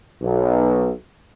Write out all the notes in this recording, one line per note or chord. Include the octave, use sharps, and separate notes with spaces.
B1